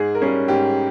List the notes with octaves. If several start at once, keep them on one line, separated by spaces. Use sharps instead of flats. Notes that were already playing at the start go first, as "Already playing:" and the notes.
Already playing: G#2 G#4
A#4
G3 C#4 G#4
G#2 G4